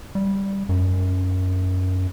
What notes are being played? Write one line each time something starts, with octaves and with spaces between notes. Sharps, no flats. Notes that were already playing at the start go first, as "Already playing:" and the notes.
G3
F#2